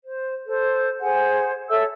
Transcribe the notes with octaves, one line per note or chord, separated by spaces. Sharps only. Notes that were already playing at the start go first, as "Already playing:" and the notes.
C5
A4 C5
G#4 C5 F#5 G#5
A4 C#5 E5 E6